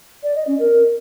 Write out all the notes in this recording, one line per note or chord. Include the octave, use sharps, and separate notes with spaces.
D5
D#5
C#4
A#4